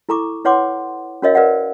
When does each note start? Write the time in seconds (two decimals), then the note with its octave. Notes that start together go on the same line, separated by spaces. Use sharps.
0.09 E4 A4 A#5 C#6 D6
0.45 E4 B4 C#5 F#5 C6 D6
1.22 C#4 F#4 A#4 C#5 D#5 F5
1.35 A#4 B4 D5 D#5 F5 F#5